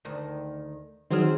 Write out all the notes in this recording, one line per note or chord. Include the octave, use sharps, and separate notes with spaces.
D2 D#3
D#3 F#3 C4 C#4 G#4 F6